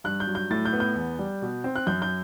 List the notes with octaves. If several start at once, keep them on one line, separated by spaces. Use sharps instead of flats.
G2 F#6
G6
F#3
G6
A2 A6
G6
B3
G6
E2
G3
B2
C4
F#6
F#2 G6
G6